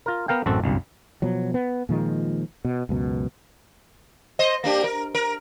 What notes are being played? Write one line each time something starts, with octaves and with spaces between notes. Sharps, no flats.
F4 A#4
B3 A#4 F5 G5
A1 F#2 C4 F#4 A4
G1 C2 F#2
B2 F3 F#3
B3
A#2 D#3 F3 G#3
B2
C#2 F#2 B2
C5 D#5
A#3 D4 G4
A#4
A#4